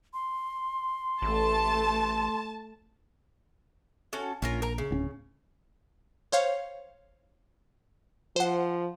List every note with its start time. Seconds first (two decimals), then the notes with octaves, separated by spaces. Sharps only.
0.13 C6
1.22 A1 A3 A5
4.13 C#4 F#4 A4
4.42 A#1 C#4 F4 A#4
4.62 A#4 A#5
4.78 C#3
4.91 D1 C4 C#4
6.32 C5 C#5 F5
8.36 F3 C5 F#5